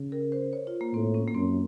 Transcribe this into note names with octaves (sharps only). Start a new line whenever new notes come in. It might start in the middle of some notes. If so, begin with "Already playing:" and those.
Already playing: C#3
A#4
C5
C#5
F4
A#3
A2 C4
C#4
A#3
F#2 C4